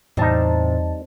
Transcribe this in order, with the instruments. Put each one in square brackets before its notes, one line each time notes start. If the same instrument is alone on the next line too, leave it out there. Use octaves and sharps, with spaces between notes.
[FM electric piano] E2 A5 [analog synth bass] A2 [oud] C3 [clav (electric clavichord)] G3 D#4